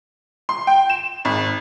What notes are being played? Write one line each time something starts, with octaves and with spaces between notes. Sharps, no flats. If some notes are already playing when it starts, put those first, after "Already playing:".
C6
G5
E7
G#1